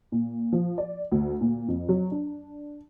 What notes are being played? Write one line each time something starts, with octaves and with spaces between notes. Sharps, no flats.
A#2
F3
D5
D2
A#2
F2
F#3
D4